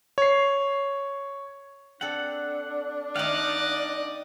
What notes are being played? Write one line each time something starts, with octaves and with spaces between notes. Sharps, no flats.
C#5 C7
C4 D4 A4 F#5
D#3 A3 D#4 D5 D#5 F5 F#5